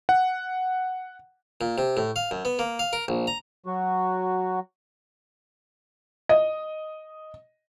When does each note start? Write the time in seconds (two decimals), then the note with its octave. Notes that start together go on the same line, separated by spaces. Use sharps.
0.09 F#5
1.61 A#2
1.78 C3
1.97 A2
2.16 F5
2.31 F#2
2.45 B3
2.59 A#3
2.79 F5
2.93 A#4
3.08 A#1
3.27 A#5
3.66 F#3 F#4
6.29 D#5